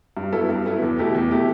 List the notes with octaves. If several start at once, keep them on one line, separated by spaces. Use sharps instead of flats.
G2
F#3 B3 E4 A4
G2
F#3 B3 E4 A4
E2
B2 A3 E4 G4
E2
B2 A3 E4 G4